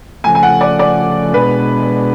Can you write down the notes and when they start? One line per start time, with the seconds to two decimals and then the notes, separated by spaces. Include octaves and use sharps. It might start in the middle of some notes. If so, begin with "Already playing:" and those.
0.24 C#3 F3 A3 G#5
0.35 G#5
0.43 F#5
0.61 D5
0.79 D5
1.34 B2 G#3 D4 B4